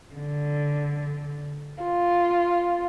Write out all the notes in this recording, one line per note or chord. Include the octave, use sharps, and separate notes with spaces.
D3
F4